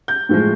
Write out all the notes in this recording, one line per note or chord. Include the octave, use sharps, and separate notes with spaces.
G6
A2 F3 G#3